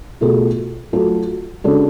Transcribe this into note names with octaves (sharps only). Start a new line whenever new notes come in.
B2 A3 F4 G#4
F#3 A3 F4 A4
C#3 G#3 D4 F#4 A4